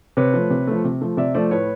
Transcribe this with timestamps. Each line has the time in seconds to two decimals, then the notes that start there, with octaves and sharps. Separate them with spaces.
0.17 C3 B4 C#5
0.34 F3 A3
0.50 C3
0.67 F3 A3
0.84 C3
1.01 F3 A3
1.17 C3 D5 E5
1.35 F3 A3 C5 D5
1.51 A2 B4 C#5